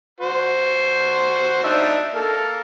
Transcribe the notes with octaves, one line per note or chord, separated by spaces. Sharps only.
F#4 C5
D4 D#4 E5
A#3 A4